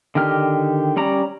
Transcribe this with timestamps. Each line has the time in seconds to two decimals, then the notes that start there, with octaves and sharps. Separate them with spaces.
0.15 D3 D#3 G4 F6
0.96 G3 C#4 D5 A#5